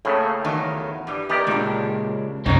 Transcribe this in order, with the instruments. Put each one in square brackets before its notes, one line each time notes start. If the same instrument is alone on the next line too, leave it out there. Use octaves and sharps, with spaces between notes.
[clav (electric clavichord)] A2 C#3 A3 [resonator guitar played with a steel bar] A#3
[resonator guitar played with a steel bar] E2 D#3 F#3
G2 G3
[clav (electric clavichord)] D#3 G4 D5 [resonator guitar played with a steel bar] B3 E4 A#4
[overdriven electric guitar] C#2 [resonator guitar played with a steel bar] A#2 D4
[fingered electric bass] C2 F#2 [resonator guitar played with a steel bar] C#3 G3 G#3 [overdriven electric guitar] C4 D#4